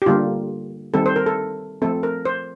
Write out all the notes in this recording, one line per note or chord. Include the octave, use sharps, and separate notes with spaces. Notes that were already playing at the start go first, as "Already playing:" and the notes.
G4
D3 G3 A#3 F4
D#3 G3 C4 A4
C5
A#4
A4
F3 A3 C4 A4
A#4
C5